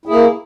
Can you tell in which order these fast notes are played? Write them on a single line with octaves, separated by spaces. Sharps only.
E4 G#4 A#3